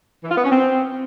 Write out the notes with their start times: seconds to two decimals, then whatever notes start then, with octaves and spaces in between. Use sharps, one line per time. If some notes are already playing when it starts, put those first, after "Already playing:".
0.24 E3
0.31 F4
0.38 B3
0.44 C#4
0.51 C4